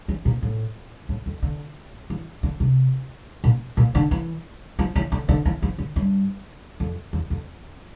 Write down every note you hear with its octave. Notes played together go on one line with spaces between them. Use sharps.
E3
A#2
A2
A2
F2
D3
E3
D3
C3
A#2
A#2
D3
E3
F3
E3
D3
D3
E3
F3
D3
G2
F2
E2
F2